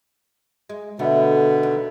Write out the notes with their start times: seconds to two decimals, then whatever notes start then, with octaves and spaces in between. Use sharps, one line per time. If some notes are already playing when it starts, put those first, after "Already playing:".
0.69 G#3
0.99 B2 D3 A3 B3
1.63 D#2